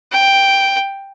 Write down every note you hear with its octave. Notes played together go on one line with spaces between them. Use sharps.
G5